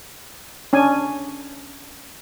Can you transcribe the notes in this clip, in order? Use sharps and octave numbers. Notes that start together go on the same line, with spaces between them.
C#4 D4 G#5